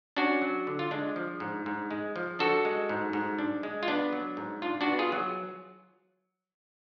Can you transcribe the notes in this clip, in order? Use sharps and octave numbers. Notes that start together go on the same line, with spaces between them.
C#4 D4 F#4
F#3
D3
F4
G#3 D4
F3
G#2
G#2
G#3
F3
D4 F#4 A4
G#3
G#2
G#2
D4
G#3
F4
B3 D4
F#3
G#2
D4 F4
D4 F#4
B3
F4 G#4
F#3